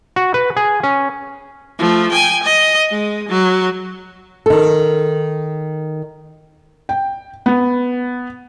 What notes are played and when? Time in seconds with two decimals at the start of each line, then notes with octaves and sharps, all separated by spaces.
0.16 F#4
0.34 B4
0.57 G#4
0.83 C#4
1.79 F3 A3
2.12 G5 G#5
2.43 D#5
2.91 G#3
3.29 F#3
4.46 D#3 A4
6.89 G5
7.46 B3